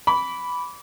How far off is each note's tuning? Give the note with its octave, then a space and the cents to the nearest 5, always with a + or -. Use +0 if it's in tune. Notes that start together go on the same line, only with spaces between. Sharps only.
B5 +0 D6 -30